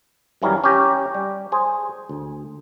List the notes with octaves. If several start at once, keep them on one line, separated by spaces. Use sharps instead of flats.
F#2 D#3 E3 F#3 G3 A#4
C#4 G4 A#5
G3
G#4 C5 G#5
D2